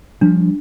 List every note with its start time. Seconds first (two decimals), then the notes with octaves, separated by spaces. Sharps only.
0.21 F3 G3 D4